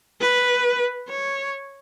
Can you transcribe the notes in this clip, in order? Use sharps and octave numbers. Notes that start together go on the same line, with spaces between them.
B4
C#5